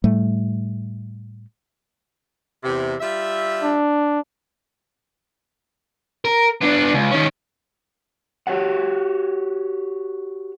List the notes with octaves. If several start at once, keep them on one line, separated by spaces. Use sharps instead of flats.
A2 G3 A3
E2 C3
G3 F4 E5
D4
A#4
B3 D4
C#2
D#3 C#4
F#4 G4 A4 B4 C#5 F#5